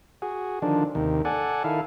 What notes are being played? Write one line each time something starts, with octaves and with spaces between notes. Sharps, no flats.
F#4 G#4
D3 D#3 F3 D4
D#2 C3 D#3
A4 D5 F#5 G#5
D#3 E4 A4 F5